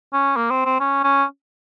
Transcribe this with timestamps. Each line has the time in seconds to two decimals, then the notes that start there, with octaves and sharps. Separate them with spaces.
0.13 C#4
0.36 A#3
0.50 C4
0.66 C4
0.80 C#4
1.03 C#4